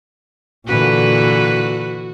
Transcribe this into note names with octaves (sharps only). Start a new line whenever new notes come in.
A#2 D3 E3 F#4 B4